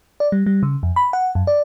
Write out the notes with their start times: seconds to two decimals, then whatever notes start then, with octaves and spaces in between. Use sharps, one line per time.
0.20 D5
0.32 G3
0.46 G3
0.63 C#3
0.83 F2
0.96 B5
1.13 F#5
1.35 F#2
1.47 D5